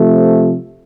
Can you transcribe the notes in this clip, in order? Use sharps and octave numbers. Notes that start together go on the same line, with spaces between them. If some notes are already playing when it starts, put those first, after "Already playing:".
Already playing: C3 F3 A3